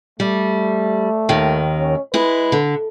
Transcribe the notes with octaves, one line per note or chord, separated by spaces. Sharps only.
G3 A3
D#2 D#3
C#4
G#3 E4 B4
D3